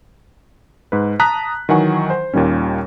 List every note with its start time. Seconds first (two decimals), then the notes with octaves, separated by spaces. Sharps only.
0.92 G#2 B4
1.20 A5 A#5 D#6 F#6 B6
1.69 D#3 E3 F#3 F#5 G#5 C#6
2.10 C5
2.34 D#2 A#2 D#3 G3 C#4